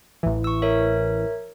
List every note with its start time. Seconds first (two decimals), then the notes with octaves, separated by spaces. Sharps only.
0.23 A1 E3
0.44 C#6 E6
0.62 A#4 C#5 E5